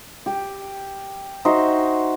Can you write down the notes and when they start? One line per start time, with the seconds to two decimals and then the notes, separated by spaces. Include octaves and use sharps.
0.26 G4
1.45 D#4 F#4 C5 E5